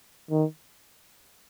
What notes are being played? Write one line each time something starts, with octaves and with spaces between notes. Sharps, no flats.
D#3